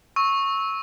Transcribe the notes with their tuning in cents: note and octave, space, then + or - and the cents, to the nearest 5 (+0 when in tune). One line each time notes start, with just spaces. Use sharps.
C#6 -10 E6 -20